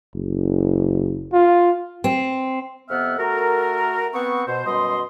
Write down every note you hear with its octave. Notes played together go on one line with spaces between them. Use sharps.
F#1
F4
C4
F2 C3 B3 E5 F#5 F6
A3 F#4 A4 A#4
B3 C4 C#6
B2 C5
F#2 B2 G3 D#5 C6